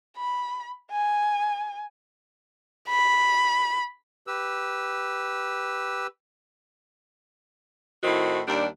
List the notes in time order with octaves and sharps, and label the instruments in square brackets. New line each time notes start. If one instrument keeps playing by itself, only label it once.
[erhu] B5
G#5
B5
[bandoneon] G4 B4 E6
[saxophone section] A2 D#3 C4 E4 F#4
D#2 G3 D4